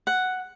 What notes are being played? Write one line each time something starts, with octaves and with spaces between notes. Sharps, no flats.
F#5